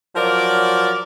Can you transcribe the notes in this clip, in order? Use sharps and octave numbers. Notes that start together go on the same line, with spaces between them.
F3 F#3 A#4 D5